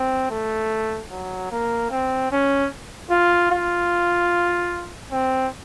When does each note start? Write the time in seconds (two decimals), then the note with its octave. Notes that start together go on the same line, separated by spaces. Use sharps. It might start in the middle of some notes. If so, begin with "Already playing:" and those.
Already playing: C4
0.31 A3
1.11 F#3
1.51 A#3
1.91 C4
2.32 C#4
3.10 F4
3.51 F4
5.11 C4